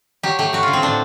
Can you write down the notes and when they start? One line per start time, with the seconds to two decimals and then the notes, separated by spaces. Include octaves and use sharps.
0.23 F#3 G4
0.39 A3 G4
0.53 F#3 F#4
0.63 F4
0.68 D3
0.73 C4
0.82 A2 D4